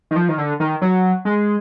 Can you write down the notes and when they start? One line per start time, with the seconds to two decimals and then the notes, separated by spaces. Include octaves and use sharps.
0.11 D#3
0.16 F3
0.29 D#3
0.38 D3
0.60 D#3
0.82 F#3
1.25 G#3